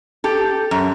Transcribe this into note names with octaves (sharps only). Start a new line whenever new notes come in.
G4 A4
F#2